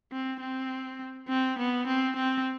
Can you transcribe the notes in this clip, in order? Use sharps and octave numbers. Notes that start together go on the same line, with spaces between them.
C4
C4
C4
B3
C4
C4